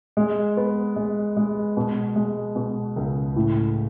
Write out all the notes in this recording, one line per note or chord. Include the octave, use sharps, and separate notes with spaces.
G#3
B3
G#3
G#3
B2
G#3
B2
C#2
A2